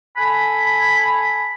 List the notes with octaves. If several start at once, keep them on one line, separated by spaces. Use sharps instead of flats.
A4 G#5 B5